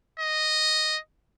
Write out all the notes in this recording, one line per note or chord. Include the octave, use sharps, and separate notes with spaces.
D#5